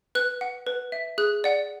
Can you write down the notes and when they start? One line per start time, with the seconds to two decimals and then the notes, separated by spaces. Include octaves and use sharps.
0.15 B4 F#6
0.41 F#5
0.67 B4
0.92 E5
1.18 G#4 F#6
1.44 D5 F#5